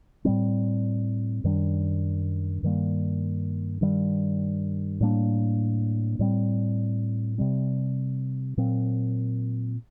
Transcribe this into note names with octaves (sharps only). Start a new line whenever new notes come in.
A2 G3 C4
F#2 D#3 G3 D4
G2 D#3 G3 A#3
G2 D#3 G3
A2 G3 A#3 D4
A2 G3 C4
C3 G3 C4
A#2 F#3 C4